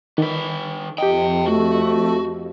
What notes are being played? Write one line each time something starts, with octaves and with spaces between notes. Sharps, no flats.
D3 D#3 B4
F2 G4 D#5 E5 G5
A3 F#4